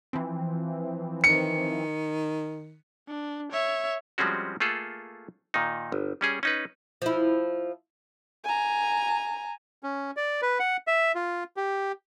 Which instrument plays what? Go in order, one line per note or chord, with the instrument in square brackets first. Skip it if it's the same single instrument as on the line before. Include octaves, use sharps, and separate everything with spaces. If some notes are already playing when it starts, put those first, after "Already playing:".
[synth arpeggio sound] E3 F3 C4
[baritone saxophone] D#3 [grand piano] C#7
[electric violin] D4
C#5 E5
[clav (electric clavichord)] F3 G3 G#3 C4 C#4 F#4
A3 A#3 F4 G#4 A4
A#2 D#3 D#4
G1
G3 C#4 G#4
C#4 D#4 B4
[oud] F3 E4
[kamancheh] G#5 A#5
[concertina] C#4
D5
B4
F#5
E5
F4
G4